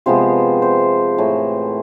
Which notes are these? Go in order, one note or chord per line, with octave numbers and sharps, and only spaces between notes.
C3 F3 G#3 B3 C5
C5
A2 E3 A3